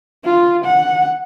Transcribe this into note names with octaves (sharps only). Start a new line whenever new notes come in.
F4
F#5